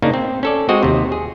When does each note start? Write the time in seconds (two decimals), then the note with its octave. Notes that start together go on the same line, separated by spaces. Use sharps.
0.02 C#3 A#3 D4 D#4
0.14 C4
0.43 C#4 A4 D5
0.69 G#3 C4 F#4 D#5
0.83 D#2 C3
1.12 G#4